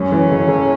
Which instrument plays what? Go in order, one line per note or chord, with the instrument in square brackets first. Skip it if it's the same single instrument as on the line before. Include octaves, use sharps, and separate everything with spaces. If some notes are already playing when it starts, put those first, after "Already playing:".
Already playing: [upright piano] F#2 [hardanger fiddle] C#4
[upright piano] E3
F#1
F#1